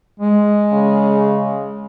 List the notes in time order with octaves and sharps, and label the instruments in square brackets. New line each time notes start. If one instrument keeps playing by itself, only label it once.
[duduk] G#3
[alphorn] C#3